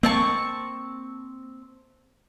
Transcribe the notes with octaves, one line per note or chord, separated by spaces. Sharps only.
A#3 C4 A5 C#6